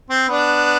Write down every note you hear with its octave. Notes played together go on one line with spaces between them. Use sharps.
C4
B3 D4